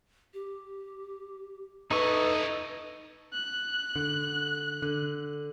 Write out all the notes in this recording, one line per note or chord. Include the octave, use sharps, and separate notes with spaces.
G4
D#4 E4 A4 B4 D#5 C#6
F#6
D3
D3